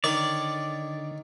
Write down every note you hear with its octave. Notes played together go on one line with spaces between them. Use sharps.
D3 D#3 C#5 D5 C#6